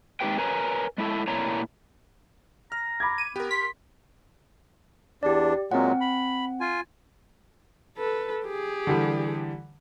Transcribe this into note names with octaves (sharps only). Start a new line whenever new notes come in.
G#3 C4 D#4 G4 B4 G5
A#4 B4 C#5 G#5 A#5
G#3 A3 E4 G#4 A4
A#2 A3 E4 C#5 A#5
A#5 F6
B5 D6 G#6
D#7
B3 G4 A#4
C6 B6
E2 D4 G4 D5
A#2 F#3 G#3 C4 F#5
B5
F4 G#5
A4 B4
G4 G#4
D3 E3 G3